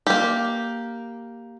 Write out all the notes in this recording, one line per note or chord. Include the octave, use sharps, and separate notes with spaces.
A#3 G4